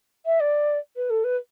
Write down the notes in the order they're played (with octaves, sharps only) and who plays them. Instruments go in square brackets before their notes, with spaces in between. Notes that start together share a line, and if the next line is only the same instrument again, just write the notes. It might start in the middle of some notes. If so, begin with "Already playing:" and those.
[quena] E5
D5
B4
A4
B4